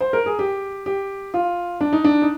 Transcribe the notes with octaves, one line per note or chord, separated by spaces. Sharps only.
C5
A#4
G#4
G4
G4
F4
D4
D#4
D4
D#4